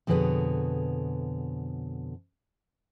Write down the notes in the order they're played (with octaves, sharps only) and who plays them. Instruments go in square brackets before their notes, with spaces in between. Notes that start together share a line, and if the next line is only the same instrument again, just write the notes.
[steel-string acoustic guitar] F2 B2 D3 G#4 B4 C#5